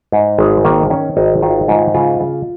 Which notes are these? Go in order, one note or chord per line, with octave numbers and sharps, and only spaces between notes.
G#2
G#1 G#3
D#3 A#3
D#3 C#4
G#1 D#4
D#3 F4
G#2 F4
C#3 F4
C#3